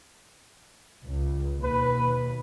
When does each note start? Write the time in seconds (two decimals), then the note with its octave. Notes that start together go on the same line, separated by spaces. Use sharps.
1.05 C#2
1.62 D#2 B2 B4